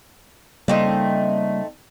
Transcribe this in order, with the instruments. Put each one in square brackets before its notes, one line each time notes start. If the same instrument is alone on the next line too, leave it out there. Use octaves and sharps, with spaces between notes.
[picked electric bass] C#3 G3 A#3 [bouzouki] A3 C4 D#4